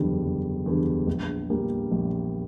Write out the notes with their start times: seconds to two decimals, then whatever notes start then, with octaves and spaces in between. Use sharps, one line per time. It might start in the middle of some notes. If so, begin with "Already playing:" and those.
Already playing: F#1 E2 D3 G3
0.24 F#1
0.66 E2 D3 G3
1.07 A#1
1.50 A#2 G3 A#3
1.92 A#1